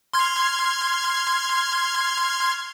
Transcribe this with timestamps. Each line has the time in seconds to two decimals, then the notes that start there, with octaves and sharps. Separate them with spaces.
0.13 C6 F6 G#6